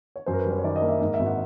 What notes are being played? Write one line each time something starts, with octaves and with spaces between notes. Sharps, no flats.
C#5
F#2 C5
A#4
B4
G3
C5
C#5
D#3 D5
D#5
A#3
E5
G#2 D#5
E5
G#1
F#5